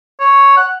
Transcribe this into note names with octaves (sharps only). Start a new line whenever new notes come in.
C#5
F#5